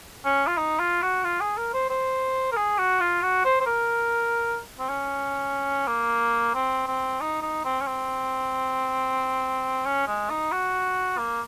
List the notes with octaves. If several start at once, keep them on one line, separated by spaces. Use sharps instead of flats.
C#4
F4
D#4
F4
F#4
F4
G#4
A#4
C5
C5
A#4
G#4
F#4
F4
F#4
C5
C5
A#4
C4
C#4
A#3
C4
C4
D#4
D#4
C4
C#4
C4
C#4
G#3
D#4
F#4
A#3